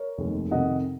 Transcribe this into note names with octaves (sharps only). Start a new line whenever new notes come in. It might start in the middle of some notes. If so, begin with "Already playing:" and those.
Already playing: A#4 C#5
F1 D#2 D#3 G#3
F2 C3 D#3 D#5 F#5